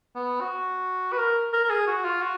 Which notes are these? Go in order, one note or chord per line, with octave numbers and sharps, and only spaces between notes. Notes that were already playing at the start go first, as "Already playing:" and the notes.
B3
F#4
B4
A#4
A#4
A#4
G#4
F#4
F4
F#4